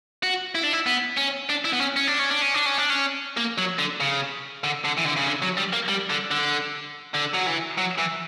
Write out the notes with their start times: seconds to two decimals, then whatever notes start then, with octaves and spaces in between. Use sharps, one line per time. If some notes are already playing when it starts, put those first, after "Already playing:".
0.23 F#4
0.55 E4
0.63 D4
0.73 E4
0.86 B3
1.17 C#4
1.50 D4
1.65 E4
1.73 B3
1.81 C#4
1.97 C#4
2.08 D4
2.19 C#4
2.31 D4
2.42 C#4
2.54 D4
2.66 C#4
2.78 D4
2.90 C#4
3.37 A#3
3.58 F#3
3.79 D3
4.01 C#3
4.64 D3
4.84 D3
4.97 E3
5.05 D3
5.16 C#3
5.26 D3
5.42 F#3
5.58 G3
5.73 A#3
5.89 G3
6.10 D3
6.31 D3
7.14 D3
7.34 F#3
7.46 E3
7.78 F#3
7.98 E3